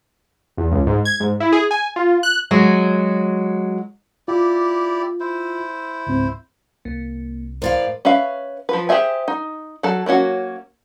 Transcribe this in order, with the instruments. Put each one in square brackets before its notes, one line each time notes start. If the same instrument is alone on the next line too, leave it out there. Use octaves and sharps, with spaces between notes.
[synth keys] E2
C#2
G#2
G#6
G#2
E4
G#4
G#5
F4
F#6
[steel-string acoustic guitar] F#3 G#3 F#4
[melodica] E4 G4 D5 [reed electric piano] F4
[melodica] E4 C5
[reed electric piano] C#2 G#2 C4
[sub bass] C2 [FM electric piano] A#3
[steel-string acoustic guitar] A2 D5 F5 [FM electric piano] A#4 C5
[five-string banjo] C#4 B4 E5 F5
F3 B4
G4 G#4 C5 E5 G#5
D#4
F#3 A4
F#3 A#3 C#4 F#4